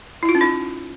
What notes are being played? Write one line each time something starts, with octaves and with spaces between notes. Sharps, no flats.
E4
F4
C#4
D#4